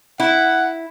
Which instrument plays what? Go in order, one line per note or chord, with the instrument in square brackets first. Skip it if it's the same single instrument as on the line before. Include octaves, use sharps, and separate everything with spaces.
[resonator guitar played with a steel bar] E4 [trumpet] F#5